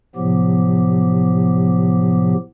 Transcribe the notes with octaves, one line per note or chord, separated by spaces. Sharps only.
A2 C3 F3 F#3 B3 G4